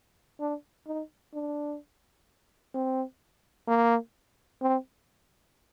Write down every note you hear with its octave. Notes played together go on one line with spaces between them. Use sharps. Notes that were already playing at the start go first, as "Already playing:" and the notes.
D4
D#4
D4
C4
A#3
C4